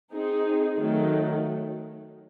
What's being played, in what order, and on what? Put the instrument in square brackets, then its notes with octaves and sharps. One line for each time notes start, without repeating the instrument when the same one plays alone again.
[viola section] C4 D#4 G#4
D#3 F#3 A3